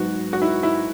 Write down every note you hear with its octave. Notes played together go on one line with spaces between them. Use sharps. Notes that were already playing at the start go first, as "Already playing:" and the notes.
Already playing: G#2 F#3 B3 F#4
F#4
E4
E4